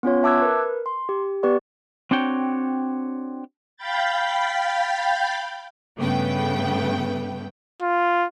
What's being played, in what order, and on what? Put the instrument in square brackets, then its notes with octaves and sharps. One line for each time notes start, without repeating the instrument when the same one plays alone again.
[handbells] B3 C#4 F4 C#5
E5 A5 D6 E6 F#6 G#6
A#4 B4
C6
G4
B3 G4 B4 D5 C#6
[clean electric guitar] C4 D4 F#4 C#5 G5
[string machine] F5 G5 B5 G6 A6
[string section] G2 C#3 A3 B3 B4 G5
[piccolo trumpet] F4